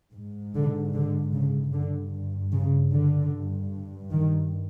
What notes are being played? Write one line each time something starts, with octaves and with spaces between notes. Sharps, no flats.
G#2
D3
D3
C#3
G2 D3
C#3
D3
G2
D#3